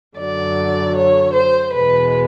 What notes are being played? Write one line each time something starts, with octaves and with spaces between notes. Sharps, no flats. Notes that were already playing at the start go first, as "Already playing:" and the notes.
F#2 D3 F#3 D5
C#5
C5
E2 B2 G#3 B4